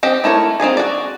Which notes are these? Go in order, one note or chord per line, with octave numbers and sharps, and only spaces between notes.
C4 G4 D#5
A3 E4 A#4 C#5
C4 D#4 F4 G#4
F#4 D5